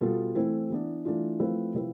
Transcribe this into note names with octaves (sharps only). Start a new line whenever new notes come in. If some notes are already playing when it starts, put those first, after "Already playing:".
B2 G3 B3 F4 A4
E3 A3 C4 E4
E3 B3 D4
E3 A3 D4 F4
F3 A3 C4 E4 B4
C3 F3 C4 E4 B4